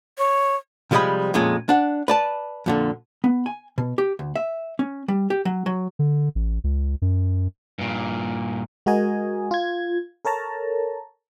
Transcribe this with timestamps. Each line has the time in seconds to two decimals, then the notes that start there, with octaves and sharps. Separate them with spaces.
0.18 C#5
0.91 C3 F3 G3 G#3 D#5 B5
1.34 F2 A#2 G#3 C#4
1.69 D4 F#5
2.08 B4 D5 A5
2.66 F2 A#2 D3
3.24 B3
3.46 G#5
3.78 B2
3.98 G4
4.19 D2
4.36 E5
4.79 C#4
5.08 G3
5.30 G4
5.45 F#3
5.66 F#3
5.99 D3
6.35 A1
6.64 C#2
7.02 F#2
7.78 G2 A#2
8.86 G#3 F#4 A#4 D#5 G#5
9.51 F4 G#6
10.25 A4 A#4 C#5 A5 A#5